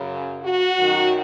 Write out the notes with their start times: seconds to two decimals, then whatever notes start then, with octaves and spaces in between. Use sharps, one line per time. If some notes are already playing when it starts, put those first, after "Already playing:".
Already playing: F#2 C#3
0.43 F#4
0.78 F#2 D#3